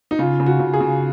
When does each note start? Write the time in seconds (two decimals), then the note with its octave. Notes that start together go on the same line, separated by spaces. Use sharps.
0.11 D#4
0.19 C#3 F4
0.40 C#3
0.46 F#4
0.60 C#3
0.73 G#4
0.80 C#3